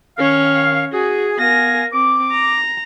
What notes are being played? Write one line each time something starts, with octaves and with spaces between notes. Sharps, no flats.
D#3 C#4 C#5 F5
F#4 G#4
B3 A#4 F5 G#5 A#6
C4 D6
A#5